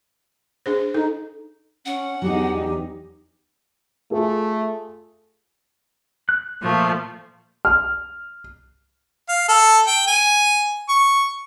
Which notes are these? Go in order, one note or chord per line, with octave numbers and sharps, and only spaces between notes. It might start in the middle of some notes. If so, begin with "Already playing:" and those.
D4 G#4 C5
D#4 A4
C#4 F#5
E2 F#3 D4 D#4 G4 G#4
A3 F4 G#4 A4
F#6
A#2 F3 A3
F6
F5
A4
G5
G#5
C#6